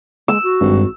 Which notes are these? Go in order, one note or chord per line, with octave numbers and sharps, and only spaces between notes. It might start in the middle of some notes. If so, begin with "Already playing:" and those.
G#3 E6
F#4
G#1 G2